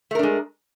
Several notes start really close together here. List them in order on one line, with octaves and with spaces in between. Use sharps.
A3 A#4 D4 G#3